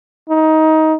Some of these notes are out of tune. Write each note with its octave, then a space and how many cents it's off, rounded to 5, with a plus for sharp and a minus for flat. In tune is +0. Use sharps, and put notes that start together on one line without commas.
D#4 +20